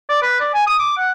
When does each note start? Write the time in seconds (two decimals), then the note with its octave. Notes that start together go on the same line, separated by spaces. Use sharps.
0.09 D5
0.22 B4
0.40 D5
0.54 G#5
0.67 D#6
0.79 D6
0.97 F#5